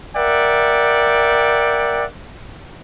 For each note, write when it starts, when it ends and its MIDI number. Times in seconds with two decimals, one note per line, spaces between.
0.16 2.05 70
0.16 2.05 74
0.16 2.05 76
0.16 2.05 78
0.16 2.05 79